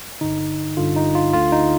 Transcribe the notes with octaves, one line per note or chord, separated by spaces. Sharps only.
G1 G2 D3 D#4
G1 G2 D3 F4
D#4
F4
D2 D3 F4
D#4